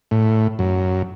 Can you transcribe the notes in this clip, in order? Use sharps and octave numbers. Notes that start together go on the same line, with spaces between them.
A2
F#2